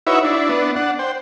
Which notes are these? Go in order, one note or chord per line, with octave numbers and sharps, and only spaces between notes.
D#4 E4 F#4 B4 C#5 E5
D4 E4
B3 D4
D4 F#5
C5 G5